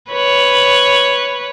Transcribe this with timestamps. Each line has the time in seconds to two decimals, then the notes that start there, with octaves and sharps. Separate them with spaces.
0.11 B4 C#5